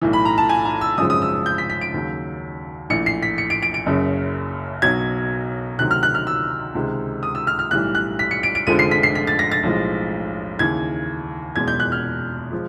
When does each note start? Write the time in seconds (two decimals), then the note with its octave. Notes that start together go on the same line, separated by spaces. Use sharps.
0.02 B1 A2 E3
0.13 B5
0.25 A#5
0.38 A5
0.49 G#5
0.65 A#5
0.81 E6
0.98 G#1 F#2 C#3 F3 G#3 D#6
1.10 D#6
1.22 E6
1.46 G6
1.58 B6
1.70 B6
1.81 D7
1.94 D#2 C#3 F#3
2.90 A#1 A2 E3 C#7
3.06 C7
3.23 B6
3.38 C#7
3.50 D7
3.62 D7
3.74 D7
3.86 F#1 F#2 C#3
4.82 B1 B2 F#3 G#6
5.78 D2 C3 D#3 F#3 F#6
5.91 F6
6.03 F#6
6.15 F6
6.27 E6
6.75 C#2 C3 D#3 G#3
7.23 D#6
7.35 E6
7.47 F6
7.59 F6
7.71 B1 A2 E3 G3 F#6
7.95 F#6
8.19 B6
8.31 C#7
8.43 D7
8.55 D7
8.67 F1 F2 D3 F3 G#3 D#7
8.79 C7
8.91 B6
9.03 C7
9.15 B6
9.27 A6
9.39 A#6
9.52 A6
9.63 B1 A2 F3 G#3
10.59 D#2 C#3 E3 G#6
11.56 F#1 E2 B2 G#3 G#6
11.68 G6
11.80 F#6
11.92 F6
12.52 F3 G#3